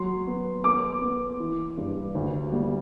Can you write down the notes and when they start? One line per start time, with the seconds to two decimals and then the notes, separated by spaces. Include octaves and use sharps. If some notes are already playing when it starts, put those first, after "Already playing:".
Already playing: F#3 C6
0.27 B3
0.64 B3 D6
1.02 B3
1.40 E3
1.77 G2
2.15 D2
2.53 G3